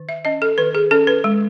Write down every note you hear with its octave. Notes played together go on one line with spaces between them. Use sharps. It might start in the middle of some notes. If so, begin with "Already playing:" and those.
Already playing: D#3
E5
C#4 D#5
A4
D#3 B4
G#4
C#4 A4
B4
G#3